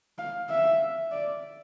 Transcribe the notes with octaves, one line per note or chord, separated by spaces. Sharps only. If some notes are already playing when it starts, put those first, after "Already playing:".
F5
E5
D5